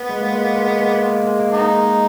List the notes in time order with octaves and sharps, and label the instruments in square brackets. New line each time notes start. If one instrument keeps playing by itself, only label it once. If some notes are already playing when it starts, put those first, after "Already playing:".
Already playing: [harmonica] B3
[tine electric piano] G#3
A#3
G#3
A#3
G#3
A#3
G#3
A#3
G#3
A#3
G#3
A#3
[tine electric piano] G#3 [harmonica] B3 D#4
[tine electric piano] A#3
G#3